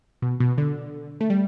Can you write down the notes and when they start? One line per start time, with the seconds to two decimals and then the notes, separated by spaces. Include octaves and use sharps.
0.22 B2
0.40 B2
0.58 D3
1.21 A3
1.30 G3